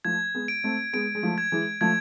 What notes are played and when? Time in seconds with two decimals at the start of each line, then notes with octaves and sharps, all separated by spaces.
0.04 F3 A3 G#6
0.35 G#3 B3
0.48 D7
0.64 A3 C4
0.93 G#3 B3 D7
1.15 G#3
1.23 F3 A3
1.38 G#6
1.52 E3 G#3
1.81 F3 A3 G#6